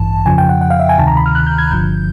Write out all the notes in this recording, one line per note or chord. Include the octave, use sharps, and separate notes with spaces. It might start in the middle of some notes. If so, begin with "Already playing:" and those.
Already playing: A1 G2 E3 A5
F2 C#3 F3 G#5
G5
F#5
F#5
F5
E5
G#5
D2 C3 D#3 A5
A#5
B5
F6
F#6
G6
G#6
G1 G2 D3 F3 G6